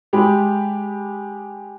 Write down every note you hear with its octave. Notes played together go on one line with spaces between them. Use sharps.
G#3 G4 B5